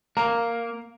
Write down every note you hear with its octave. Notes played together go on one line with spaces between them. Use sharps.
A#3 A#5